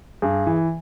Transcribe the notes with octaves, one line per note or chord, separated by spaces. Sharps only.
G2 G#4
E3